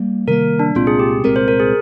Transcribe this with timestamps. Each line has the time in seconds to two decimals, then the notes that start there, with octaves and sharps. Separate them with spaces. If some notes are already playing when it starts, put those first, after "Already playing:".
Already playing: G3 A#3
0.27 C3 D#3 G3 A#3 A#4
0.59 D4
0.75 C2 A#2 G#3 C4 F4
0.87 G#4
0.99 G4
1.24 C2 A#2 G#3 C4 A#4
1.36 C5
1.48 A#4
1.60 G#4